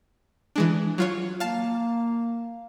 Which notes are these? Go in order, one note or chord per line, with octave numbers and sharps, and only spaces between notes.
E3 G#3 D4
F#3 F4 C#5
A#3 F5 A5